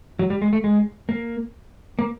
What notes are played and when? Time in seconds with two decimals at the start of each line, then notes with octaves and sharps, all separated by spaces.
0.19 F#3
0.30 G3
0.42 G#3
0.53 A3
0.64 G#3
1.09 A#3
1.99 A#3